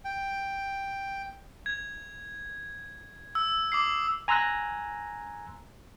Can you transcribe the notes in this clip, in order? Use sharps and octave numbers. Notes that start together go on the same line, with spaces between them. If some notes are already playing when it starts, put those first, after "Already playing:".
G5
G#6
E6
D6 D#6 C7
G#5 A#5 C6 E6 F#6 A#6